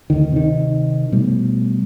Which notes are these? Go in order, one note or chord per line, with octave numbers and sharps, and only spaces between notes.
D2 D3 D#3
C3 D#3
B2 G3 A3